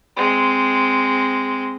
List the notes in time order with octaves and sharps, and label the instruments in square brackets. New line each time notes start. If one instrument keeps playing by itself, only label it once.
[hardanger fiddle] G#3 C4